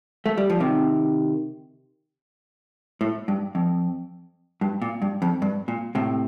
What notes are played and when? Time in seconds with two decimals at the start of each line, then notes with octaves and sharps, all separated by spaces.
0.26 A3
0.37 G3
0.50 F3
0.60 C3 D#3
3.01 A2
3.28 G2
3.55 F2
4.61 G2
4.82 A#2
5.02 G2
5.22 F2
5.42 G2
5.68 A#2
5.95 A2 C3